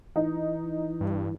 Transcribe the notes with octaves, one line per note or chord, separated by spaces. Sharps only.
E3 D#4
G2